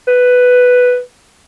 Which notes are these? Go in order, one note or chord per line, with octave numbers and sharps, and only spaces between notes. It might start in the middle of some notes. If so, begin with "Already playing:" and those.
B4